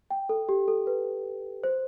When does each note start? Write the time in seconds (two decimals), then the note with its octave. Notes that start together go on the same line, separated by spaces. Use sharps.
0.11 G5
0.29 A4
0.49 G4
0.68 A4
0.87 B4
1.64 C5